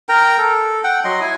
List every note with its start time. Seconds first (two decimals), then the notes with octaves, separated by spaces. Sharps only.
0.09 A#4 G5 A#5
0.38 A4
0.84 F#5 G5
1.05 F#3 D#5 C6
1.21 E4 G#5